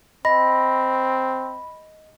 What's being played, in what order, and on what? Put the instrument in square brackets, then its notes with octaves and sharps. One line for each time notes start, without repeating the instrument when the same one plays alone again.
[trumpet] C4 [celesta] D#5 A#6 [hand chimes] B5